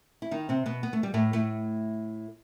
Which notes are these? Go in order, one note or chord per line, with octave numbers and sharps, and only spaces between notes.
E4
D#3 D#4
C3 C4
B2 B3
B3
A3
G3
A2 A3
A2 A3